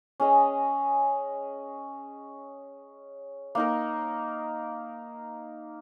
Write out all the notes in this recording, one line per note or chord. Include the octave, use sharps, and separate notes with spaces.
C#4 G#4 D#5
A#3 D#4 A#4